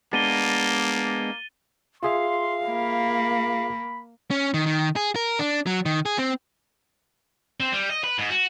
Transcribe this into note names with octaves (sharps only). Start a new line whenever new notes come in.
G#3 A#3 B3 D4 A6 D#7 G7
F4 G#4 E5 F5 C6
A#3 B5
C#4
D#3
D#3
G#4
A#4
D4
F#3
D#3
G#4
C4
C4
G3
D#5
B4
G#2
F#4